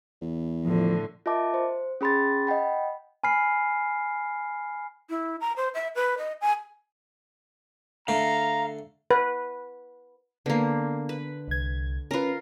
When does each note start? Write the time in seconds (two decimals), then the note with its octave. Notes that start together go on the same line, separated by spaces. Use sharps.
0.21 E2
0.64 A2 D3 F3
1.26 F4 A#4 D#5 E5 A5 D6
1.54 C5
2.01 C#4 G#4 B5 C6 A6
2.47 D#5 F#5 G5 B5
3.24 G#5 B5 F6 C7
5.10 E4
5.41 A#5
5.57 C5
5.74 E5
5.95 B4
6.18 D#5
6.41 G#5
8.08 D3 A3 F5 A#5
9.11 B4
10.46 D3 A#3 B3
11.09 B4
11.48 C2 G#6
12.11 C#4 F4 A#4 B4